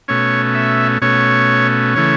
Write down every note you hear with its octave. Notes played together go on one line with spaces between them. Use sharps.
B2 A3 C#4 C#5
E5
B2 A3 C#4 C#5
C#3 E3 A3 C#5